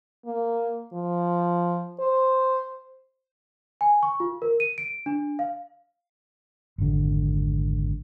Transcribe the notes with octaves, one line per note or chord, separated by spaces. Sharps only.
A#3
F3
C5
G#5
C#6
F4
A#4
D#7
D7
D4
F5
G#1 F2 D3